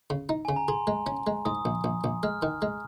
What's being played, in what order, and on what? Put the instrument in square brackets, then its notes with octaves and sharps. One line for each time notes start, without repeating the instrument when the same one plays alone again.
[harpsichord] C#3
D#4
[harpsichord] C#3 [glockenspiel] G#5
[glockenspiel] A#5
[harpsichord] G#4 [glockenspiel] C6
[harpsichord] G#3
C#4
G#3
[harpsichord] G#2 [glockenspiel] D#6
[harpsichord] A#1
A#1
A#1
[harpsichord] G#3 [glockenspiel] F6
[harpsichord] D#3
G#3